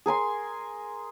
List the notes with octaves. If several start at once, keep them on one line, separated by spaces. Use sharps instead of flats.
G#4 A#4 G#5 C6